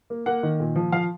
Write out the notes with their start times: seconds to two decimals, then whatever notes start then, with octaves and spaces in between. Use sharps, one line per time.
0.10 A#3
0.26 A#3 F#5
0.43 D#3
0.60 A#2
0.76 F3
0.92 F3 F5